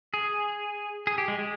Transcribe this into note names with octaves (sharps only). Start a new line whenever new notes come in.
G#4
G#4
G4
G#3
G#3